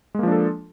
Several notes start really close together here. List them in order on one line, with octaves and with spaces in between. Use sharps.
G#3 A#3 F3 D4 A4